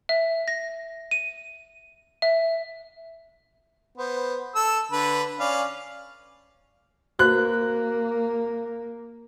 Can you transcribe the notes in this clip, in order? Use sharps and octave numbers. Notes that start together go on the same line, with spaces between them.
E5
A#6
D#7
E5
B3 C5
A4 E6
D3 B4
C#4 D5 F5
A#3 F#4 B4 C5 F#6